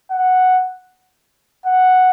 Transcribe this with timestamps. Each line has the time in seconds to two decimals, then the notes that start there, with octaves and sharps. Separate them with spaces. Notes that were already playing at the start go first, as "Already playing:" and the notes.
0.11 F#5
1.66 F#5